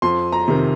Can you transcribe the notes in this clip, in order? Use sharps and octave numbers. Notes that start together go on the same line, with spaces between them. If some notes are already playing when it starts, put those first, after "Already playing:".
F2 C6
A#5
C3 D#3